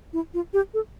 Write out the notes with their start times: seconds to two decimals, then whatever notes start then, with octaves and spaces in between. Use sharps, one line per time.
0.13 E4
0.34 F4
0.53 G4
0.74 A4